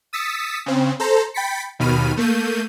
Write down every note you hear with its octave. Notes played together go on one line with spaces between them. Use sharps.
D#6 E6 A6 B6 C#7
C#3 C4
A4 C5 A#5
G5 B5 A6 B6 C#7
D#2 B2 D#3 B5 F6 D#7
A3 A#3 G6 D#7